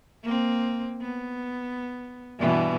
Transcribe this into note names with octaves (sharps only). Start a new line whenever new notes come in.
A#3 C4
B3
G2 B2 E3